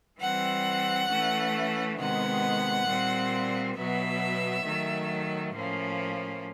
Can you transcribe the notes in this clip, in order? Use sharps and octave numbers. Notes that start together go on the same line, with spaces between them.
E3 G3 C4 F#5
E3 A3 C#4
C3 D#3 G#3 B3 F#5
A#2 G3 C4
B2 F#3 B3 E5
D#3 F#3 A3
A2 F3 A#3 C#4